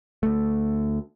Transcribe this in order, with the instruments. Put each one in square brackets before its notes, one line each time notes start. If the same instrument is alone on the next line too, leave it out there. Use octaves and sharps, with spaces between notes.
[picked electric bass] D2 A3